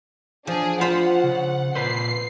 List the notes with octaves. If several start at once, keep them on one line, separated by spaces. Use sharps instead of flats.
F3 D4 G#4
F4 C5 F#5 B5
C#3
A#2 B4 C5 C7